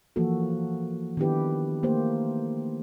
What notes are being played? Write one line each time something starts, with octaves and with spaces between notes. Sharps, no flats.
E3 F3 A#3 F#4 A4
D#3 B3 D4 E4 G4 B4
A3 A#3 G4 C5